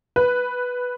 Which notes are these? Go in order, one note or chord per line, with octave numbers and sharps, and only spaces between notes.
B4